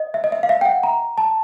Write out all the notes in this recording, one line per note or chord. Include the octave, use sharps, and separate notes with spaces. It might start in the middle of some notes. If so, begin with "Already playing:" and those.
Already playing: D#5
E5
D#5
E5
F5
E5
G5
F#5
A#5
A5